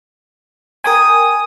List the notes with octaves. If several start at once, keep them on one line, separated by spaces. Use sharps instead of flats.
A#4 G5 G#5 D#6